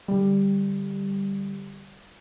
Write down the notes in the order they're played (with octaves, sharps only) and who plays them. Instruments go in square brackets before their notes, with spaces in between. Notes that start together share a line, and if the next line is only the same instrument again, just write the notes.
[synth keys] D3 G3